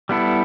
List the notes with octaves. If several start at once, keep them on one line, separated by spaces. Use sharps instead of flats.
G3 B3 E4 A4